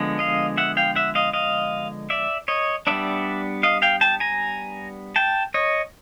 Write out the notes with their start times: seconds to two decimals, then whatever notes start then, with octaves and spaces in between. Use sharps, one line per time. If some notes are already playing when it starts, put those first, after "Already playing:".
Already playing: D3 F3 G#3 B3
0.19 D#5 F5
0.57 E5 F#5
0.77 F5 G5
0.96 E5 F#5
1.15 D#5 F5
1.33 D#5 F5
2.10 D5 E5
2.48 C#5 D#5
2.87 G3 B3 D4 D5 E5
3.63 D#5 F5
3.82 F5 G5
4.01 G5 A5
4.20 G#5 A#5
5.16 G5 A5
5.54 C#5 D#5